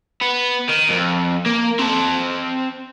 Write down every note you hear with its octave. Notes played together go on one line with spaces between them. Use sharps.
B3
D#3
F2
A#3
C4 A5